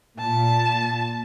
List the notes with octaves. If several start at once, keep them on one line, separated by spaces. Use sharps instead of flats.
A#2 A5